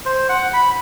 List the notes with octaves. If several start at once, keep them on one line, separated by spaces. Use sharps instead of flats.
C5
F#5
B5